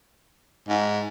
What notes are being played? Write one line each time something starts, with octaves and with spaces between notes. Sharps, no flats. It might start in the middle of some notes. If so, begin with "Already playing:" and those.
G#2